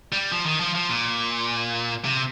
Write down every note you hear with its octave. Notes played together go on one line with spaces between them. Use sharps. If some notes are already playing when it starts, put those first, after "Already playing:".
G3
F3
D#3
F3
F3
A#2
C3